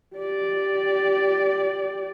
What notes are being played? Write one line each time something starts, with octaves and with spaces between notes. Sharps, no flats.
G4 D5